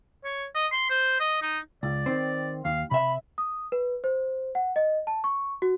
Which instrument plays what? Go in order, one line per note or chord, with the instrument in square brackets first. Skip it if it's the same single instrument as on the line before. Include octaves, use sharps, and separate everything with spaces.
[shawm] C#5
D#5
C6
C5
D#5
D#4
[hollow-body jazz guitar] C#2 [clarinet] D5
[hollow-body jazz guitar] D#3 C4
[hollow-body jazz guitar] D#2 [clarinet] F5
[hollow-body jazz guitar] C3 E5 [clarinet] B5
[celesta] D#6
B4
C5
F#5
D#5
A5
C#6
F#4